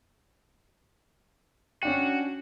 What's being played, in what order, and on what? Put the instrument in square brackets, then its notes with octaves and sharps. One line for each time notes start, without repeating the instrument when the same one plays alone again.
[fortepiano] C#4 D4 G5 [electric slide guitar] F#4